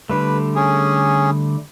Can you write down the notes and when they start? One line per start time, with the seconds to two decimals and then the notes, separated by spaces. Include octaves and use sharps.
0.10 D3 G3 A3 B4
0.56 C#4 G#4